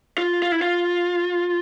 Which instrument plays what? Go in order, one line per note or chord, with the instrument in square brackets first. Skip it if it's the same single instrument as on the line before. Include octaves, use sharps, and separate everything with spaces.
[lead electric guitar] F4
F4
E4
F4